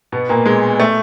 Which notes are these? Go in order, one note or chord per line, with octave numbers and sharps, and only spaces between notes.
B2 B3
A#2 A#3
G#3
A3